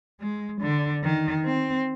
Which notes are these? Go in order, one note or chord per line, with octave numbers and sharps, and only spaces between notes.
G#3
D3
D#3
C4